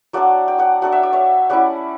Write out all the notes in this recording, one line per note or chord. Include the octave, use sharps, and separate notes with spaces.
F#3 A3 D4 D5 F#5
G5
D5 F#5
F#3 A3 D4 F#5
E5
D5
C#5 E5
G3 C#4 E4 D5 F#5